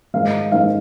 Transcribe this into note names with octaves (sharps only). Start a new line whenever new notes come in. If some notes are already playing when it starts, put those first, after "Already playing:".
G#2 D#3 G#3 F5
G#2 D#3 G#3 F5